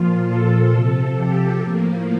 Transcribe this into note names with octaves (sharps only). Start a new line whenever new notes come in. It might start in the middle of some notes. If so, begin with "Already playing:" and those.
Already playing: A#2 F3 F4
A4
C3 F3
G4
A2 F3 A#3